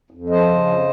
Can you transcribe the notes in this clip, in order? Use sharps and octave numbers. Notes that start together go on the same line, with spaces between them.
F2
F3 C5 D#5
C#3
F2